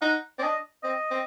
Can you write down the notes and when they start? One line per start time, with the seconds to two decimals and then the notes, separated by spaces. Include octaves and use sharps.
0.02 D#4 F#5
0.39 C4 D5
0.43 D4 D#5
0.84 C4 D#5
1.11 C4